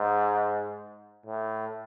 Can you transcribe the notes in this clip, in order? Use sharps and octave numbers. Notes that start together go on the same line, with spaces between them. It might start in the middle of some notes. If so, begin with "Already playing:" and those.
Already playing: G#2
A2